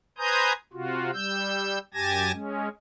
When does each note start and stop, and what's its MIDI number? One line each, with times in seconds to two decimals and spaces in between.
0.18 0.53 71
0.18 0.53 72
0.18 0.53 80
0.18 0.53 82
0.18 0.53 87
0.18 0.53 91
0.73 1.11 48
0.73 1.11 65
0.73 1.11 66
1.14 1.78 55
1.14 1.78 88
1.14 1.78 91
1.94 2.32 42
1.94 2.32 67
1.94 2.32 80
1.94 2.32 81
1.94 2.32 92
1.94 2.32 94
2.33 2.68 56
2.33 2.68 61